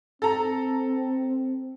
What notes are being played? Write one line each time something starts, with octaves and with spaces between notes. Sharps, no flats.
C4 A4 A#5